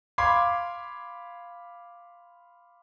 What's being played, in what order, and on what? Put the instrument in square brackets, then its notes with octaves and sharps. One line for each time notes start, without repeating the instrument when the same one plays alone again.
[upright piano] F5 B5 C6 D6 G#6